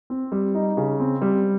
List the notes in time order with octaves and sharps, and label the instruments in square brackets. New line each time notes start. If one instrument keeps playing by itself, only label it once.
[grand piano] C4
G3
D#4
C#3
C4
G3